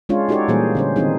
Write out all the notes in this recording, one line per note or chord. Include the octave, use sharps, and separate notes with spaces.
G#3 C#4 D4 F4 C#5
D#4 F#4 G4 A4 C#5 D5
A#2 E3 G3 A#3 G#4 C5
D3 C#4 C5
D#3 E3 C4 D4 D#4 G#4